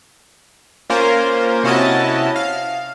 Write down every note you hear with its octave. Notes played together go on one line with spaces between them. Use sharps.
A#3 C#4 F4 A#4 C5
C3 C#4 E4 F#4 D#5 A5
F5